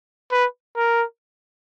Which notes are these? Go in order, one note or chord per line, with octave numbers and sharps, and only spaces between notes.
B4
A#4